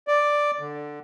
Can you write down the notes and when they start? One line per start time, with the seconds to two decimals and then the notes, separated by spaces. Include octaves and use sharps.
0.08 D5
0.60 D3